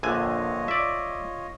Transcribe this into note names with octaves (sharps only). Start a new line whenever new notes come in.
A#1 D3 F4 C#5 D#5 G#5
D5 E5